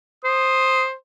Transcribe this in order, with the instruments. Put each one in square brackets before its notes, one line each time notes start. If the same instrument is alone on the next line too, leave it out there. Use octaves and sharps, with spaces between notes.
[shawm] C5 [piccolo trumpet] D#6